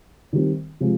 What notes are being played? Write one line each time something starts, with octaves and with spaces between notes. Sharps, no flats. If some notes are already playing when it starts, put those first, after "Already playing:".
D#3 G3 C4
C3 F3 G#3 C4 F4